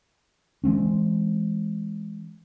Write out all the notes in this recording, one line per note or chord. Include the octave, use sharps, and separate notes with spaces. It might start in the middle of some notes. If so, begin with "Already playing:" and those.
E3 G#3 C4 C#4